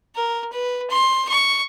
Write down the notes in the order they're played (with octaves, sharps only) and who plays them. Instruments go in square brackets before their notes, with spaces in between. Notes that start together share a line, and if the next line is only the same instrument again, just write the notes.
[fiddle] A#4
B4
C6
C#6